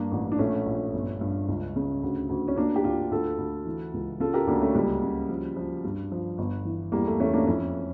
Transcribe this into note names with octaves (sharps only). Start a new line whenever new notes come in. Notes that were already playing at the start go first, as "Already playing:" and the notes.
Already playing: G2 A#3 D4
A1
D4
A#1 A3 C#4
A#1
G1
G2
C#2
C#3
D2
D2
C#4
D2 A#3 D4
G4
D2 D4 F4
D2 F4 A4
D2
E3
C#2
C#3 F4 A4
G4 A#4
D2 A#3 D4
A3 C#4
C#2 G3 A#3
C#3
F3
F3
G2
F3
G1
E3
E2 G3 A#3
A3
E2 A3 C#4
A#3 D4
F2 C#4 E4